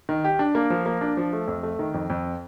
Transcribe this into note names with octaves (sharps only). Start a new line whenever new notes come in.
D#3
G4
D4
A#3
F3
A#3
D4
F3
A3
F2
A3
D#3
F2
F2